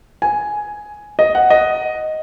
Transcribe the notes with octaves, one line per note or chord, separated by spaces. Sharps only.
G#5
D#5
F#5
D#5